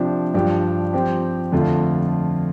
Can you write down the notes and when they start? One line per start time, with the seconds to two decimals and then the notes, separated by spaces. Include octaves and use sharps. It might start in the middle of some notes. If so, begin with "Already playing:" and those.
Already playing: C3 F3 D4 G4
0.34 G2 F3 D4 G4
0.93 F3 C4 G4
1.52 F2 D3 A3 F4